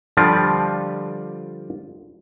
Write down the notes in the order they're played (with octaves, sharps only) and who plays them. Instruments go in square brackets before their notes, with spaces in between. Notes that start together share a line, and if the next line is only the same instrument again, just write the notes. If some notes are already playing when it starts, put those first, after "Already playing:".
[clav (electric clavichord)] D3 F3 G3 F4 D5